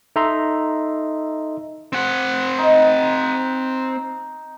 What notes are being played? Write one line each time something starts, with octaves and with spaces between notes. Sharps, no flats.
D#4 A4 D#5 E5 A#5 C6
C4 F#5
D#4